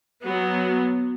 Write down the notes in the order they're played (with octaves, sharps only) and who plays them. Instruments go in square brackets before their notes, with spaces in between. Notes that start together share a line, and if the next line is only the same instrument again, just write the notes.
[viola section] F#3 B3